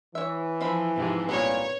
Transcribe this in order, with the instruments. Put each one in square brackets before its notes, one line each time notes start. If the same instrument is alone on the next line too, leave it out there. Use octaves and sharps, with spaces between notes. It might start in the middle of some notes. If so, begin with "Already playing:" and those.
[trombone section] E3 [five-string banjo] C#5 E5
[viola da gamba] F3 [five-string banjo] C4 E4 B5
[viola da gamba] G#2 C3 F3
[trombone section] C2 A#2 [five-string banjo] G#3 B3 [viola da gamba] C#5